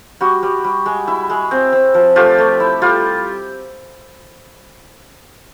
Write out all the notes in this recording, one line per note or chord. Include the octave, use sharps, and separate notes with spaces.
G3 F#4
G3
G3
G#3
E4
G#3
C4
C4
F3
A3 F4 G4
A3
E4
G3 F4